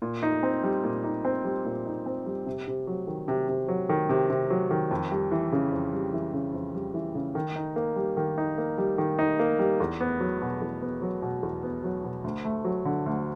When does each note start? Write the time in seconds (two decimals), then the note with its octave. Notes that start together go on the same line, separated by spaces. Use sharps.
0.02 A#2
0.23 D#4
0.43 C4
0.64 G3
0.84 A#2
1.04 D#4
1.25 C4
1.45 G3
1.65 A#2
1.86 D#4
2.06 C4
2.26 G3
2.46 C3
2.68 C3
2.87 F#3
3.07 D#3
3.28 C3
3.49 C3
3.68 F#3
3.89 D#3
4.09 C3
4.30 C3
4.50 F#3
4.71 D#3
4.91 F2
5.12 G3
5.31 E3
5.52 C#3
5.72 F2
5.93 G3
6.13 E3
6.33 C#3
6.54 F2
6.74 G3
6.94 E3
7.15 C#3
7.35 D#3
7.56 D#4
7.76 A#3
7.96 G3
8.17 D#3
8.38 D#4
8.58 A#3
8.78 G3
8.98 D#3
9.19 D#4
9.39 A#3
9.59 G3
9.80 E2
10.00 B3
10.20 F#3
10.42 B2
10.61 E2
10.82 B3
11.02 F#3
11.22 B2
11.43 E2
11.63 B3
11.84 F#3
12.04 B2
12.24 D2
12.45 A3
12.65 F#3
12.85 D3
13.06 D2